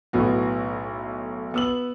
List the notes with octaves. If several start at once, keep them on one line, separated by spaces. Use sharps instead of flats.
B1 A2 B3 F#4
B3 E6 F#7